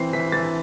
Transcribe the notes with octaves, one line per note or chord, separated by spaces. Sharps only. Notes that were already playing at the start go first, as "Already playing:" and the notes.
Already playing: E3 C4 C7
E3 B6
E3 A6